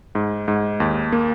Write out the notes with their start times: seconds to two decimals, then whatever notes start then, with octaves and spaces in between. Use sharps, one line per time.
0.15 G#2
0.48 G#2
0.80 D#2
1.13 A#3